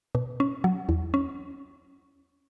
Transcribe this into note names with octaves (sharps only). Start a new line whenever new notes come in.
B2
C#4
F#3
E2
C#4